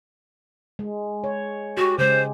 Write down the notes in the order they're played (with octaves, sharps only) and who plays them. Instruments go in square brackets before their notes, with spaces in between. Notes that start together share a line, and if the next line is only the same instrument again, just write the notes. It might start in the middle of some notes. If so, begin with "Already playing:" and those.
[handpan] G#3
C#5
[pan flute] F#4 [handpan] G4
[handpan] C#3 G#3 [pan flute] C5